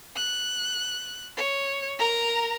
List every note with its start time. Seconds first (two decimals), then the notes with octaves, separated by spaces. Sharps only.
0.16 F#6
1.37 C#5
1.98 A#4 A#5